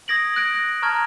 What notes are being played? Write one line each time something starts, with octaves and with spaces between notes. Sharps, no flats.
D#6 G#6 A#6 D7 F#7
F#6 G#6 A#6 D7
A#6
A5 A#5 C#6 F6 G#6